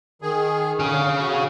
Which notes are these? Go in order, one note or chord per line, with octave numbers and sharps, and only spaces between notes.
D#3 G#4
D3 C#4 G#4 F5
F#4